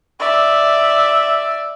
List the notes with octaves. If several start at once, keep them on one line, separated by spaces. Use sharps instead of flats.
D5 E5